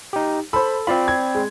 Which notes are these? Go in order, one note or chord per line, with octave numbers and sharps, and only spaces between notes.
D#4 G4
A4 C5 B5
C4 F4 D5 B5
G#6
G#3